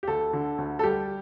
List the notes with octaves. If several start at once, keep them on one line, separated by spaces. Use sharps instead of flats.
G4
D2 A4
D3
D2
A4
G3 G4